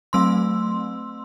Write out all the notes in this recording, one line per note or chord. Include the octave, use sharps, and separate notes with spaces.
F#3 A3 C4 C6 E6